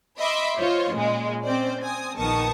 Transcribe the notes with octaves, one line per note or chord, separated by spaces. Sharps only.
D#5 E5 B5 C6 D6
F4 C5 C#5 D#5
A#2 C#3 G#3
C4 C#4 C5 D5
C4 G#5 D#6
A#1 D#3 B3 A5 C#6 D#6